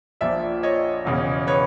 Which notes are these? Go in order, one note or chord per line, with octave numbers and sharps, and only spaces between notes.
A#1 A#2 F3 D5 E5
C#5 D#5
E1 E2 C#3
B4 C#5